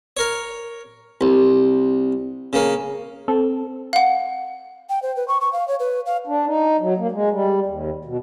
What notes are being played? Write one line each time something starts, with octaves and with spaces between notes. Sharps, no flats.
A#4 C#5
C2
C#3 A#3
C4 A4
F5 F#5
G5
C5
B4
C#6
C#6
F5
C#5
B4
F5
D4
D#4
F#3
A#3
G#3
G3
D#2
B2